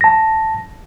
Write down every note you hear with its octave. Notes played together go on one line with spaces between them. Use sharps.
A5 A#6